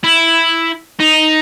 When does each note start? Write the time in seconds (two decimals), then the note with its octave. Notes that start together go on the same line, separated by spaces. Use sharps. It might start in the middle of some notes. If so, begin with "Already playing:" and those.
0.04 E4
1.00 D#4